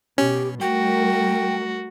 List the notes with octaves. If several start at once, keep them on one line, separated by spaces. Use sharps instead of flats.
B2 C#4 G4
G3 A3 F#4 A#4 G5